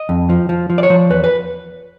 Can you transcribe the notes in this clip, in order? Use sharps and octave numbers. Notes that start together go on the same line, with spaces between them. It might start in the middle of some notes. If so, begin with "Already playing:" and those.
Already playing: D#5
F2
F3
F3
F3
D5
C#5
F3
E2 B4
B4